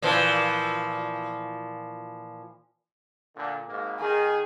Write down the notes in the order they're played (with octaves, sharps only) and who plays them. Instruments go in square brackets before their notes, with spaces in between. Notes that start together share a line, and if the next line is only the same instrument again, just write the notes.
[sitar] A#2 E3 F3
[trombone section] A#2 D3
G#1 G#2 A#3
[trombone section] D#3 [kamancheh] G#4